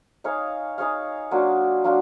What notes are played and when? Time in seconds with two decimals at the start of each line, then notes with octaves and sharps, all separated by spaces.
0.24 D#4 G#4 C#5 F5
0.78 D#4 G#4 C#5 F5
1.31 F#3 A#3 D4 F4
1.84 F#3 A#3 D4 F4